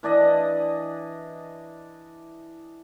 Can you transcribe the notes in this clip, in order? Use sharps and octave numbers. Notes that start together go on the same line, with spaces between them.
E3 D4 D5 D#5